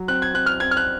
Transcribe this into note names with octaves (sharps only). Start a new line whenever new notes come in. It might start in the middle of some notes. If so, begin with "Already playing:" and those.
Already playing: F#3
C4 F#6
G#6
C4 F#6
F6
C4 G#6
F6
F#6